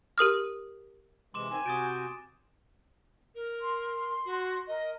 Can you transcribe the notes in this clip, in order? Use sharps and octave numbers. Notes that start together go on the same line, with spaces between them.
G4 A#4 D#6 F6
C3 E3 G#3 C6 D6 E7
D#3 C4 G#5
C3 F#4 D#6 G6 A6 D7
A#4
C6
F#4
A#4 D#5